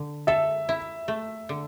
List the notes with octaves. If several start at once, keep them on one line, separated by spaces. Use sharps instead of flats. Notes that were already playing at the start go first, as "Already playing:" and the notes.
Already playing: D3
A4 E5
E4
A3
D3